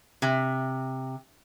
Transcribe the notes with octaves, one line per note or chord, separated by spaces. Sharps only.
C3